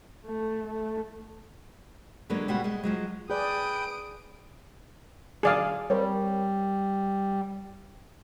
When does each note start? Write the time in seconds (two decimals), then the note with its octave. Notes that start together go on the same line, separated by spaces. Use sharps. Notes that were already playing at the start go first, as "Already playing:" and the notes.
0.25 A3
0.67 A3
2.30 D3 F#3 G#3 A#3 B4 D5
2.48 B2 G3 G#3 B3 F#4 F#5
2.64 G3 G#3
2.83 F3 F#3 G#3
3.30 G#4 B4 D5 G5 D#6 D7
5.43 A#2 D3 F#3 G#4 D5 F5
5.90 G3 C4 A#4 C#5